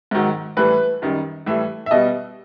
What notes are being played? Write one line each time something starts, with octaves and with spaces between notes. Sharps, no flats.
G#2 D#3 F#3
A2 E3 G3 B4
F#2 D#3 G3
A2 E3 G3 E5
E5
B2 G3 D#5